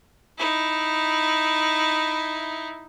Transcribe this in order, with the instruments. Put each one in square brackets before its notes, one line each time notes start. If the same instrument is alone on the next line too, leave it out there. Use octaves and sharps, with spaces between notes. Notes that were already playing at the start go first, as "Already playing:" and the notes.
[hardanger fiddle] D#4 E4